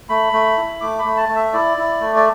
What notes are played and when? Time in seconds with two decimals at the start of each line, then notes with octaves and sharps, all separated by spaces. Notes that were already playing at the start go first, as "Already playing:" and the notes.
0.09 A3 B5
0.33 A3
0.57 E4
0.81 A3 D6
0.99 B5
1.05 A3
1.17 A5
1.29 A3
1.35 E5
1.53 E4 D5
1.77 E4
2.01 A3
2.16 D5